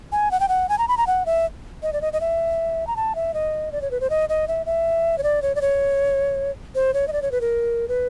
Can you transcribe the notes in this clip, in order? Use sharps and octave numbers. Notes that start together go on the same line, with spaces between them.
G#5
F#5
G5
F#5
G#5
A#5
B5
A#5
F#5
E5
D#5
D5
D#5
D#5
E5
A#5
A5
E5
D#5
D5
C#5
B4
C5
D#5
D#5
E5
E5
C#5
D5
C#5
D5
C#5
C5
C#5
D#5
D5
C#5
B4
A#4
B4